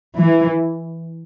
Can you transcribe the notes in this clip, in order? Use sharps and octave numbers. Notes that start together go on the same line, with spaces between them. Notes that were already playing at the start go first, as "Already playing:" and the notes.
E3